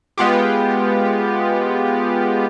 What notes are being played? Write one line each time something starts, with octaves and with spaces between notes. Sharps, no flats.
G#3 B3 F4 G4